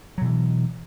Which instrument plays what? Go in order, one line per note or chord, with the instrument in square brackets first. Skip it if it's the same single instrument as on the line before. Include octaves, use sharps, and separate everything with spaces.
[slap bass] F#3
B2
E3